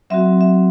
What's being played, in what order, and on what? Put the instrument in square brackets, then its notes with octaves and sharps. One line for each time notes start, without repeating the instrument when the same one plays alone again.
[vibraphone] F#3 C4 F#4 E5
E5